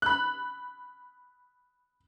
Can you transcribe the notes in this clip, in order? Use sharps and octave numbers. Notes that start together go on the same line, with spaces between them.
B5 F#6